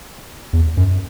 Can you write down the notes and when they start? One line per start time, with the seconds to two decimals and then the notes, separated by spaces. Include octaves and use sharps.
0.53 E2
0.77 F#2